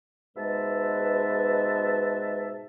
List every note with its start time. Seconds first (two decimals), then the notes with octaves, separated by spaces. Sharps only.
0.36 G#2 B2 G#3 B4 E5 A5